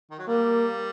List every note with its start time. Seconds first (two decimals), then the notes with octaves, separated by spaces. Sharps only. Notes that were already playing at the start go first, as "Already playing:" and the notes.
0.11 D#3
0.19 F#3
0.28 G3 A#3